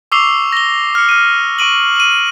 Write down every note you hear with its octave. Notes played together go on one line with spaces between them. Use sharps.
C#6 D6 E6 C7 F7 G7
A#6 G7
F6 C#7
F6 D#7
C#6 D7 D#7 F#7
D#7 F#7